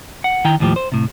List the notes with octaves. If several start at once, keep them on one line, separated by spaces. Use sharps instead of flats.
F#5
D#3 E4 G5 A#5
D#2 A2 F3 G4
C5
A2 C3